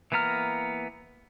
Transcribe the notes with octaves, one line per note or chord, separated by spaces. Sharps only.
E3 A#3 B3 A#5 F6